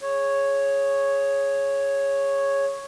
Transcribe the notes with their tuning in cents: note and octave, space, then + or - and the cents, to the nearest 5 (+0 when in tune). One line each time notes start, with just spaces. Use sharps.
G#4 +0 C#5 +0